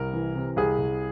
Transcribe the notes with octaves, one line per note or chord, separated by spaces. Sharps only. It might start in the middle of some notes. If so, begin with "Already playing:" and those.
Already playing: C2 A#4
E3
C3
C2 G#4
C2